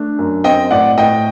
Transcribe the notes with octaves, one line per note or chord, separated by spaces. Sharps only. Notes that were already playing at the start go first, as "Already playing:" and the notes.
Already playing: A3 D4
F#2
C4 D#5 G5
A2 D5 F#5
A2 D#5 G5